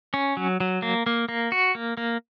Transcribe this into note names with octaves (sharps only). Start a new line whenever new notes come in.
C#4
F#3
F#3
A#3
A#3
A#3
F#4
A#3
A#3